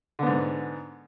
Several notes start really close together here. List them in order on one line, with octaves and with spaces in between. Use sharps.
D3 B3 G#2